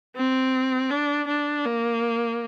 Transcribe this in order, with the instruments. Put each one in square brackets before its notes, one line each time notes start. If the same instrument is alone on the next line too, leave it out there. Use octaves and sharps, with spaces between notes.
[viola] C4
D4
D4
A#3